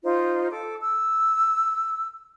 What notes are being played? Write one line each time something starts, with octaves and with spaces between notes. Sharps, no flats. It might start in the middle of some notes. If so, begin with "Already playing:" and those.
D#4 F4 C5
A4 D6
E6